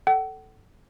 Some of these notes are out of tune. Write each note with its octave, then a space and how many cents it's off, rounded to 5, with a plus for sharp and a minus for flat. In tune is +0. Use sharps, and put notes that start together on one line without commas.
A4 +0 F#5 +40